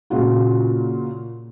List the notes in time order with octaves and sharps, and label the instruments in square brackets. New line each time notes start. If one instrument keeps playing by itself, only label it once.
[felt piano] A#2 C#3 F4 F#4